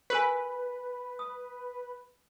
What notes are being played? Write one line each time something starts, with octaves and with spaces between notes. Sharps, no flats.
G4 A#4 B4 G#5
D#6